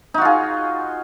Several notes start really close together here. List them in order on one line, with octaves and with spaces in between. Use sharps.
D#4 F#4 F4 G#4